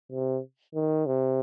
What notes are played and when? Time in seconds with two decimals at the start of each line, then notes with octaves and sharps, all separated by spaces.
0.12 C3
0.75 D#3
1.06 C3